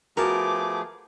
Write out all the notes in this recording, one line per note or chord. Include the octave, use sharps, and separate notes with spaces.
F3 A3 B3 F#4 G#4 A#4 A5 D6